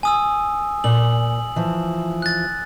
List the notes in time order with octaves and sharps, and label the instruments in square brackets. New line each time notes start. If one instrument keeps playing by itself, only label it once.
[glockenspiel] G#5 D#6 E6
[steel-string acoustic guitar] A#2 [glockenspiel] F#7
[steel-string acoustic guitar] E3 F3
[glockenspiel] F#6 A6